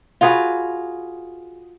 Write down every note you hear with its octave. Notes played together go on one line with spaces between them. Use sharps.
F4 F#4 G#4 B4